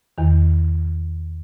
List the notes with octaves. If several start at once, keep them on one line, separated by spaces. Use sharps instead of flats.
E2 D#3